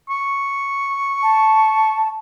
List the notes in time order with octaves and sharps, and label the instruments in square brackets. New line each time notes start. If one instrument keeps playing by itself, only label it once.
[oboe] C#6
[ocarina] A5